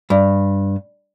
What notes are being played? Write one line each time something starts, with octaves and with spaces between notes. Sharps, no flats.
G2